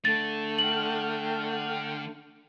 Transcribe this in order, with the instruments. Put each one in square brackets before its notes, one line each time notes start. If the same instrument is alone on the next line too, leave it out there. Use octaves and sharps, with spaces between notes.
[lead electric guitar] D3 [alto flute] A3 [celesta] A6
[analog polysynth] F#5 G5 F6 [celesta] F#7